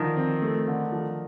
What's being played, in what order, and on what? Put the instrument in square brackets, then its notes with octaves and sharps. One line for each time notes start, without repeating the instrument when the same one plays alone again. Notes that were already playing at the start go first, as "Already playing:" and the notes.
Already playing: [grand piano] D3 F3 [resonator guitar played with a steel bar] D#3
[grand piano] C4
A3
D3
F3